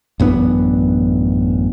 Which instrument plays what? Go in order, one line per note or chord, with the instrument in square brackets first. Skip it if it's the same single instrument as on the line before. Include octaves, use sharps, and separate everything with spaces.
[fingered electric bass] A1 F#2 B3 D4